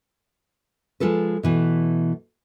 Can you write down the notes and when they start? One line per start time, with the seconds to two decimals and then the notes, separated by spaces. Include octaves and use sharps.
1.00 F3 G#3 F4 A4 B4
1.43 B2 E3 A3